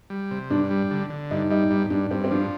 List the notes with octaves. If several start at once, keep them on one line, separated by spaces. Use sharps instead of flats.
G3
C3
G2 D4
G3
D3
D3
G2 D#4
G3 D#4
G2 D#4
G2 D4
G2 C4
C4
F3 D4